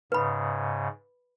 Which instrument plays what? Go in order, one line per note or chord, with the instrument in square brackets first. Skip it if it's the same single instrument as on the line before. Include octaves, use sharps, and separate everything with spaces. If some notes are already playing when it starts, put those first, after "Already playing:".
[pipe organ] G#2 C#3 [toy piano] B4 B5